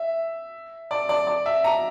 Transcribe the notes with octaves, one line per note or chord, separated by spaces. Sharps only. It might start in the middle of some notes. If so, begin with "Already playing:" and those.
Already playing: E5
D5
D5
D5
E5
A#5